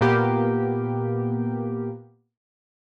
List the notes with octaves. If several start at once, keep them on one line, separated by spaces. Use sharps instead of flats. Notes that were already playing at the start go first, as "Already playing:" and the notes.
A#2 A#3 B3 G4